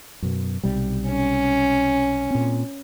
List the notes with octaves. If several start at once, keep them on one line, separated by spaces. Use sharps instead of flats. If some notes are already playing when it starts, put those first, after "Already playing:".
F#2 B2
B1 C3 G3
C#4
A#2 C4